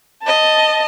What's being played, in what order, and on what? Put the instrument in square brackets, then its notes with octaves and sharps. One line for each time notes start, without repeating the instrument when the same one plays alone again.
[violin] D#5 A5